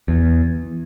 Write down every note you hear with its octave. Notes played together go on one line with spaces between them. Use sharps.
E2